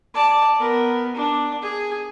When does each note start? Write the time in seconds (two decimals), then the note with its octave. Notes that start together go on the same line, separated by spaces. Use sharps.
0.14 D5 A5
0.59 B3 A#4
1.16 D4
1.62 G#4